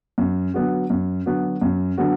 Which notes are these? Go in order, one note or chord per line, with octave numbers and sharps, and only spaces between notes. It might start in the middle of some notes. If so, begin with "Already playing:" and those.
F#2
D3 F#3 B3 F#4
F#2
D3 F#3 B3 F#4
F#2
D3 F#3 B3 F#4